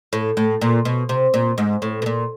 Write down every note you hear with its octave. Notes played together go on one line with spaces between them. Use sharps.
A2
A2
A#2
B2
C3
A#2
G#2
A2
B2
A#2